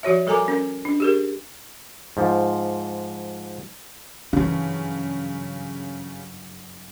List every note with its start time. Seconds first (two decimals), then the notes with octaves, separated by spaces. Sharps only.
0.03 F3 F#4 C#5 E5
0.27 G3 A4 A#4 G#5 A#5 D6
0.48 C#4 A#4
0.85 D4
1.00 G4 G#4 A#4
2.17 G#2 F3
4.33 F#1 G2 C#3 E3 C#4